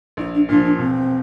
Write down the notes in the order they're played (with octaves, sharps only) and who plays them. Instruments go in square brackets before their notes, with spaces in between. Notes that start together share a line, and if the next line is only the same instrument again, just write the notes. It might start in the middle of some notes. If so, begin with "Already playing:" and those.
[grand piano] A#1 [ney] E4
[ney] D4
[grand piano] A#2 F3 [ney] D4
[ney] D4
[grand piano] E1 [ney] C4